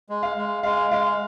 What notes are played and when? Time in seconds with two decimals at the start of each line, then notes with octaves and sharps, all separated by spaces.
0.09 G#3
0.23 F5
0.37 G#3
0.63 G#3 F5
0.91 G#3 F5